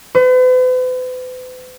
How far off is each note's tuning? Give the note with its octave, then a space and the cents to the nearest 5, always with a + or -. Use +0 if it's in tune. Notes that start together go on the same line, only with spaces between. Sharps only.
B4 +45